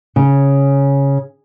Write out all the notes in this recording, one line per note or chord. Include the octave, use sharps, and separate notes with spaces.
C#3